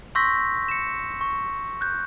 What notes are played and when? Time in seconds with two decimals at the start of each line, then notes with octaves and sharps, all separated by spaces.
0.15 C6 C#6 E6 G6 A#6 B6
0.69 C#7 E7
1.21 C#6
1.81 F#6 G6